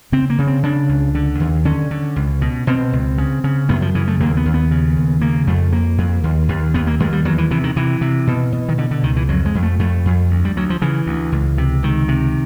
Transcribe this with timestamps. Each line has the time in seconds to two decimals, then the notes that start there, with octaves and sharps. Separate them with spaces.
0.12 C#3 C4
0.30 A#3
0.38 C#3
0.47 C4
0.63 C#3 D4
0.89 C#2
1.15 D3
1.40 D#2
1.65 D3 C#4
1.91 D3
2.16 C#2
2.41 B2
2.67 B2 C4
2.93 C#2
3.18 C#3
3.44 C#3
3.69 F#2 B3
3.82 F3
3.95 C#3 E3
4.07 A3
4.20 D#2 A#3
4.37 B3
4.46 D#2
4.54 B3
4.71 C#3
4.97 D#2
5.21 C#3 A#3
5.47 F2 A3
5.72 F2 A#3
5.98 F2
6.24 D#2
6.49 D#2
6.74 D#2 B3
6.87 A#3
7.00 D#2 G#3
7.13 G3
7.25 E2 F#3
7.38 E3
7.51 C3 E3
7.64 D#3
7.76 C3 E3
8.01 C3
8.27 B2
8.53 B2
8.69 D#3
8.78 B2 D3
8.91 D3
9.03 C#2 D#3
9.16 E3
9.29 F2 F#3
9.46 G#3
9.55 F2
9.63 A3
9.79 F2 A3
10.06 F2
10.31 D2
10.45 G3
10.56 D2 F#3
10.70 F3
10.82 C#3 E3
11.06 D2
11.32 C#2
11.58 C3
11.83 C#2 D#3
12.08 C3